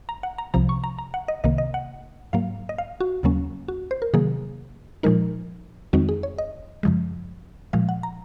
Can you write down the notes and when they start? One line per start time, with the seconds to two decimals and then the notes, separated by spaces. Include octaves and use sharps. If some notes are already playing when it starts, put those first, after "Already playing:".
0.09 A#5
0.23 F#5
0.38 A#5
0.54 C2 C3 F3 A#5
0.69 C#6
0.84 A#5
0.98 A#5
1.14 F#5
1.28 D#5
1.44 C2 C3 D#3 A#3 D#5
1.58 D#5
1.74 F#5
2.33 G#2 F#3 A#3 F5
2.69 D#5
2.78 F5
3.01 F#4
3.23 D#2 C#3 F#3 A#3 C#4
3.68 F#4
3.91 C5
4.02 A#4
4.14 C3 D#3 F#3 A#3 G#4
5.03 A#2 F3 G#3 D#4 A#4
5.93 F2 D#3 G#3 C4 D#4 F#4
6.09 G#4
6.23 C#5
6.38 D#5
6.83 F#2 C#3 F3 G#3
7.73 A#2 F3 G#3 F5
7.89 F#5
8.03 A#5